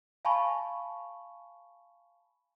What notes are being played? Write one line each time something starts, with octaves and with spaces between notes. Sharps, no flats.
F5 G#5 A5 B5 C#6